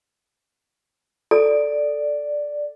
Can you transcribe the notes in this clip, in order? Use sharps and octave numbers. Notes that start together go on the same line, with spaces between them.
A4 D5